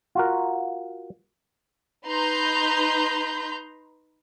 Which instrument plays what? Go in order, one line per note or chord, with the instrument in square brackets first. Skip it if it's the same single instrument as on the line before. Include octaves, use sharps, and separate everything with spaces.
[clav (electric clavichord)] F4 F#4 A#4
[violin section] D#4 B4 A#5 C6 G6